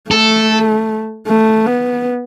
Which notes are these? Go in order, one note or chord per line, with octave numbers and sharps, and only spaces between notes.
A3 A4
A3
B3